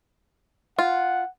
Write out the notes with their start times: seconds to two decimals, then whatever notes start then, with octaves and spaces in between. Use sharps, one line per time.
0.79 F4 F#5